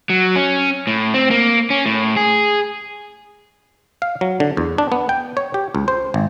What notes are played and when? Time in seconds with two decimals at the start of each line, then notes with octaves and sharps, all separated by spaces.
0.10 F#3
0.36 C#4
0.87 A2
1.14 C4
1.31 A#3
1.70 C#4
1.86 A2
2.16 G#4
4.02 F5
4.21 F#3
4.40 D3
4.57 E2
4.78 D4
4.92 B3
5.09 G5
5.37 C#5
5.54 G4
5.75 C#2
5.88 C5
6.14 G#1